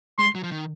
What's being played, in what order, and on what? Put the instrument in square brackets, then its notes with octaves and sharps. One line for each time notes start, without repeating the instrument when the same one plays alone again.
[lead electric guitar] G#3 [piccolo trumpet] C6
[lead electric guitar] F#3
F3
D#3